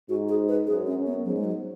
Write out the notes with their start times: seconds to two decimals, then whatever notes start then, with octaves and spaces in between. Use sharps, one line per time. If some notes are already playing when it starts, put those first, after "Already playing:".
0.09 G#2 F#4
0.29 G#4
0.49 B4
0.67 F#2 G#4
0.86 C#4
0.97 F#2
1.06 B3
1.25 G#2 F#3
1.37 G#3
1.45 F#3